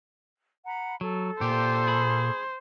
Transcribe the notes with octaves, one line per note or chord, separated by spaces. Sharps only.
F#5 A#5 B5
F#3 A4
A#2 G4 C5
G#4 B5